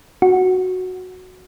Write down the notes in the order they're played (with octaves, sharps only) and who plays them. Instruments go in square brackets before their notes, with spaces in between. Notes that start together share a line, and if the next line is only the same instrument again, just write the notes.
[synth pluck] F#4